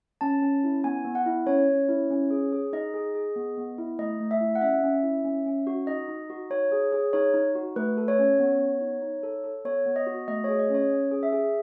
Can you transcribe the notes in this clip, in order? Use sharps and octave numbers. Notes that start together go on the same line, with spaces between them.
C#4 A5
C#4
E4
B3 G#5
B3
F#5
E4
C#4 C#5
C#4
E4
C#4
G#4
G#4
D#4 D#5
G#4
G#4
B3
B3
E4
A3 D#5
A3
E5
E4
F#5
C#4 E5
C#4
E4
C#4
C#4
F#4
D#4 D#5
D#4
F#4
D#4 C#5
G#4
G#4
D#4 C#5
D#4
F#4
A3 B4
A4
C#5
C#4
B3
B3
D#4
D#4
A4
A4
B3 C#5
B3
D#5
F#4
A3 D#5
G#4 C#5
D#5
C#4 C#5
C#4
G#4
E5
G#4